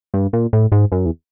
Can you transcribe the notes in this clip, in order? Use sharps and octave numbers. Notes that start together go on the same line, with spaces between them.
G2
A#2
A2
G#2
F#2
E2